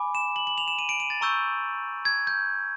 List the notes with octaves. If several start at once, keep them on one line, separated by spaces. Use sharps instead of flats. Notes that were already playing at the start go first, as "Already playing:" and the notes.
Already playing: G#5 B5 D6
E7
F#7
F#7
F7
E7
D#7
D7
D#7
A6
A#5 C#6 E6 G6
G#6
G6